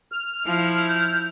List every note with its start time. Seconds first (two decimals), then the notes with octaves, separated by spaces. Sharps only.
0.12 F6
0.46 F3 E4
0.88 G6